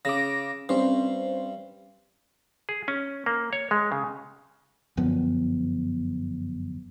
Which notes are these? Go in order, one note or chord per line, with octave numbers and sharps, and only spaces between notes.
C#3 D6 A#6
G2 C4 C#4 C5
G#4
C#4
A#3
C#5
G#3
C#3
G1 F#2 F3 B3